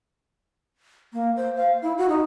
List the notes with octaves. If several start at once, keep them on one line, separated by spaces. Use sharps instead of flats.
A#3
C5
F5
E4
F#4
D#4